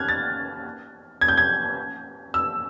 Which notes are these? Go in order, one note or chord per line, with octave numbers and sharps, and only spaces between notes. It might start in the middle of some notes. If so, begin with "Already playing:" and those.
Already playing: F6 F#6 G#6
A6
G#6
G6
G#6
E6